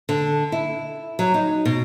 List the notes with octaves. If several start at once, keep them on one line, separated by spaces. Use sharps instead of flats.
D3
E4
F#3
D#4
B2